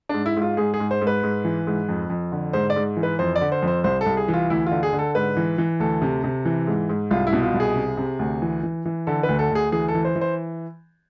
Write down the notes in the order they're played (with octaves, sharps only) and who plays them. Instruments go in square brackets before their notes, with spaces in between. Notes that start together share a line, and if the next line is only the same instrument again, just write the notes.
[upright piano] G#2 D4
E4
G#2
F4
G#2 G#4
G#4
G#2
C5
G#2
B4
G#2
E3
G#2
F2
F2
D3
G#2 C5
D5
G#2
E3
B4
F2 C5
D5
D3
C5
F2
C5
C2 C5
A4
C2
G#4
E3
F4
D2 E4
D3 F4
G#4
D3
A4
G#2 B4
E3
E3
D2 A4
C3
C3
E3
G#2
G#2
C2 F4
E4
B2
F4
C2
G#4
C3
C3
D2
E3
E3
E3
D3 A4
B4
D2
A4
D2 G#4
E3 G#4
A4
E3
C5
E3
C5